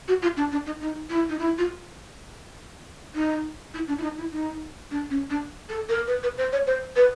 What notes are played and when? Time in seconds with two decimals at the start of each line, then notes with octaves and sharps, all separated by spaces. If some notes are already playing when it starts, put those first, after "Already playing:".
0.08 F#4
0.22 F4
0.37 D4
0.52 D4
0.66 D#4
0.81 D#4
1.10 E4
1.29 D#4
1.39 E4
1.58 F4
3.15 D#4
3.74 E4
3.88 D4
3.98 E4
4.03 D#4
4.18 E4
4.32 D#4
4.91 D4
5.11 C#4
5.30 D4
5.69 A4
5.89 A#4
6.07 B4
6.23 B4
6.38 C5
6.53 C#5
6.67 C5
6.96 B4